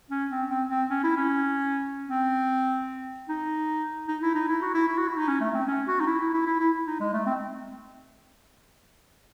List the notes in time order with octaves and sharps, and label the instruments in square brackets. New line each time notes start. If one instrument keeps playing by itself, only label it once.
[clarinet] C#4
C4
C4
C4
C#4
E4
C#4
C4
D#4
D#4
E4
D#4
E4
F#4
E4
E4
F#4
E4
D#4
C#4
A3
C4
C#4
F#4
D#4
E4
E4
E4
E4
E4
D#4
G#3
A3
C4